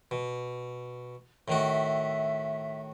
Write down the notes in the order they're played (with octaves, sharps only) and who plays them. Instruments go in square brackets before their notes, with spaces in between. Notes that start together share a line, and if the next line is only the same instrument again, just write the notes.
[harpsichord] B2
[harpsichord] A2 D#3 F#4 [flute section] E5